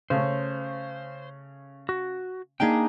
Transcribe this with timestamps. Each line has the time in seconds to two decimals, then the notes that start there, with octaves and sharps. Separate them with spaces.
0.10 C#3 A3 C#4 C5
1.89 F#4
2.60 A#3 D4 D#4 G#4 G5